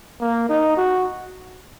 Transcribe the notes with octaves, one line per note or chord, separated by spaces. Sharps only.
A#3
D#4
F#4